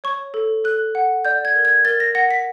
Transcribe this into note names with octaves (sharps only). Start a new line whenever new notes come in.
C#5 C#6
A4
A4 F#6
F#5
D5 G6
G#6
A#4
G#6
A#4 A6
A#6
F#5 A#6
B6